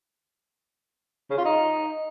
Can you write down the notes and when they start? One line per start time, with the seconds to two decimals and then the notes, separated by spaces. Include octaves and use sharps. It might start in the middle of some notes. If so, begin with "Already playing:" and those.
1.30 C#3
1.38 F4
1.45 D#4